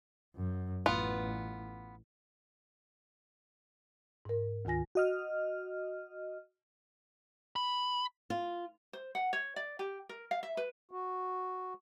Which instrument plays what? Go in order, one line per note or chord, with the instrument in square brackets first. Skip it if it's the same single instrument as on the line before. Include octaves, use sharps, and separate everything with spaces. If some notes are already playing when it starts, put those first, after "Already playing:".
[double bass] F#2
[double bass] A1 [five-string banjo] B3 F4
[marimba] G#2 A#4
D2 D#3 F4 G#5 A#6
[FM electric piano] F#4 D#5 F6
[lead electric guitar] B5
[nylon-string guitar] F4
[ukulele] C5
F#5
C#5
D5
G4
A#4
F5
E5
B4
[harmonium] F#4